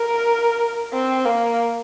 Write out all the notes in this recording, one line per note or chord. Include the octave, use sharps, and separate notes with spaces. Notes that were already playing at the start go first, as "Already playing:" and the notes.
Already playing: A#4
C4
A#3